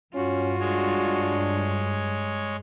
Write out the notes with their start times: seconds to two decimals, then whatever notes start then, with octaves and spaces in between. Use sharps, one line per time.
0.14 G2 C#4 F4 F#4
0.60 G#3 D4 C#5